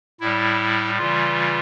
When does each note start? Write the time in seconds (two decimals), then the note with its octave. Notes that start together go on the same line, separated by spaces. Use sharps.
0.20 A2 G3 E4
0.98 C#3 E3 G3 F4